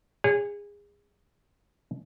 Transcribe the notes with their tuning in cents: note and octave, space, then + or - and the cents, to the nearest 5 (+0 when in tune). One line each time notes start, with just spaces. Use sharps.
G#4 -25 C#5 +0